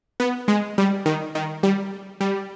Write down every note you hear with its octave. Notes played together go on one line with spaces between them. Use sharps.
B3
G#3
G3
D#3
D#3
G3
G3